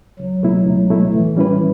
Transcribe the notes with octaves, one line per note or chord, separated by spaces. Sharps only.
C#2 F#3
B2 A3 E4
C#2
B2 A3 E4
A2 E3
G3 C#4 E4 B4